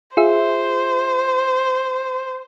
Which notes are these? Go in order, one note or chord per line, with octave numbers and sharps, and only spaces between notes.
F4 G#4 C5 E5